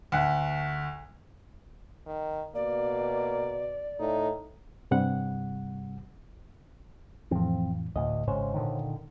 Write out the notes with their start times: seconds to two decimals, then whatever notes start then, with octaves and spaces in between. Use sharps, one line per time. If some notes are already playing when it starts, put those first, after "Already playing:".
0.12 D2 F#5
2.06 D#3
2.55 B2 A#3 D5
4.00 A2 D#4
4.91 G2 C3 G3 F#5
7.31 F2 A2 E3 F3 C4
7.96 D2 A2 D#5
8.28 G#1 G#2 C#3 C5 C#5
8.54 A#2 D3 D#3